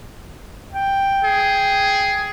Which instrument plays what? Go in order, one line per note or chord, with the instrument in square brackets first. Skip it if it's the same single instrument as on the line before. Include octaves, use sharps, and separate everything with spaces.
[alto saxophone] G5
[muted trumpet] G#4